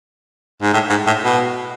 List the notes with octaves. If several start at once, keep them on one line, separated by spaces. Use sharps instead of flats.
G#2
A2
G#2
A2
B2